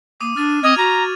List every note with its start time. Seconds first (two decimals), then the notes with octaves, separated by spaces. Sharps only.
0.21 A#3 D6 D#6 D#7
0.36 D4 F6 A6 D#7
0.63 C4 D#5 F6 G#6 F7
0.77 F#4 A#5 F6 D#7